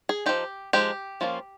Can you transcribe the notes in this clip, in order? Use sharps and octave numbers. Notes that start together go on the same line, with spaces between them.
G#4
F3 G#3 D#4 G4
F3 G#3 D#4 G4
F3 A#3 C#4 F4